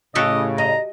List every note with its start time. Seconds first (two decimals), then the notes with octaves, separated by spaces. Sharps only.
0.15 A2 C#3 F#4 G4 A4 D#5
0.58 D#5 A#5